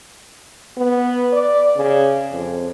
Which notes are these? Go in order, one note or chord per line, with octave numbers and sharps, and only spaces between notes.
B3
D5
C#3
F2